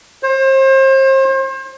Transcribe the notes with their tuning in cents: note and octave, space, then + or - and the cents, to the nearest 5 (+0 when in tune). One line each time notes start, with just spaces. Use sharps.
C5 +35